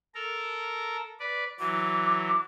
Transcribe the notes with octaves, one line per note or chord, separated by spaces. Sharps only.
A4 A#4 A#5
B4 D5
E3 F#3 D6